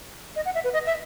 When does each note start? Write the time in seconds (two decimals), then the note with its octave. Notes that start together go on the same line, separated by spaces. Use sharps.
0.36 D#5
0.45 F#5
0.55 E5
0.64 B4
0.73 D#5
0.86 E5